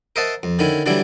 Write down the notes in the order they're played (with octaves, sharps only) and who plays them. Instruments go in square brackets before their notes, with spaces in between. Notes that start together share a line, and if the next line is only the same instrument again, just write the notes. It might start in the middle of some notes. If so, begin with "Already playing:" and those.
[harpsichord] A#4 C5 D#5 E5 F#5 A5
F2
D3 D#3 C#4 E4
D3 E3 F#3 G3 D4 E4